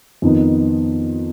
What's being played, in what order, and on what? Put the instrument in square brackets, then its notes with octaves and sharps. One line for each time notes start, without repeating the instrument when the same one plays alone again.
[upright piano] F2 D#3 B3 D#4